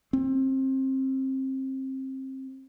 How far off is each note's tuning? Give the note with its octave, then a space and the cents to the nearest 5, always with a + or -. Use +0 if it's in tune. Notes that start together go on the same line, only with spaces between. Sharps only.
C4 +25